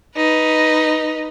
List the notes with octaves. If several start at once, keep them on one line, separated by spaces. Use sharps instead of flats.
D#4 B4